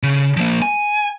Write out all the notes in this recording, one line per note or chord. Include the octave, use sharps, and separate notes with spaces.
C#3
F3 A#3
G#5